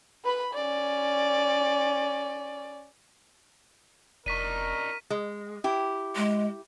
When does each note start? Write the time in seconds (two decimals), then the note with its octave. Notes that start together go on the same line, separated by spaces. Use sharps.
0.24 B4 B5
0.54 C#4 D5
4.26 F1 D4 D#4 A#4 C#6 B6 D#7
5.10 G#3
5.64 E4 G4
6.16 G#3